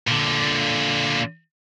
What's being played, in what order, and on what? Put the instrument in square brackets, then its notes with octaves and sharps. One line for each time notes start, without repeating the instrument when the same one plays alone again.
[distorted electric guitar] A#2 D3